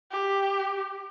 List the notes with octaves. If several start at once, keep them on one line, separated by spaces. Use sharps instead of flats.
G4